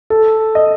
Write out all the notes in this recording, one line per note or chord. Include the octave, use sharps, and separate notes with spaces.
A4
D#5